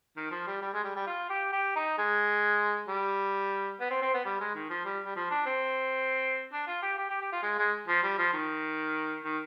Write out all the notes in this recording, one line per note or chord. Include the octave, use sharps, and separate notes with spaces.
D#3
F3
G3
G3
G#3
G3
G3
F4
G4
G4
D#4
G#3
G3
B3
C4
C4
B3
G3
G#3
D#3
F3
G3
G3
F3
D4
C4
D4
F4
G4
G4
G4
G4
F4
G#3
G#3
F3
G3
F3
D#3
D#3